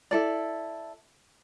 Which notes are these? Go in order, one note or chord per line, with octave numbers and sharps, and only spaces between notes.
E4 A4 D5